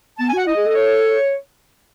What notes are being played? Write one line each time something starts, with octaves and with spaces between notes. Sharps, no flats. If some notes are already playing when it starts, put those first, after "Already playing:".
B3 A5
G#5
F#4 F#5
E4 D#5
G#4
A4 D#5
C#5